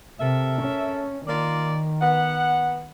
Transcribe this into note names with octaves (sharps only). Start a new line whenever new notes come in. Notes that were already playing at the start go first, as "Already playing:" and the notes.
C3 A4 A#4 E5
C#4
D#3 A#3 F4 D5
B3 F#5